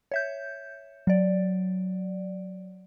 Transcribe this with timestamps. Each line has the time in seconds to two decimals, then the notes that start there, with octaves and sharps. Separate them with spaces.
0.12 C#5 E5 G6
1.07 F#3 D5